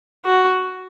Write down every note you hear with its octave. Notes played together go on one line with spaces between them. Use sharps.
F#4